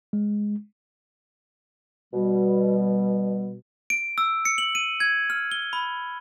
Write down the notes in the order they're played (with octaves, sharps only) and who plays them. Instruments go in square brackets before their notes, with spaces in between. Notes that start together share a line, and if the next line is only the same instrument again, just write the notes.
[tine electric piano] G#3
[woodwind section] B2 G3
[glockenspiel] D7
E6
C#7
F#7
D#7
G#6
F6
G7
B5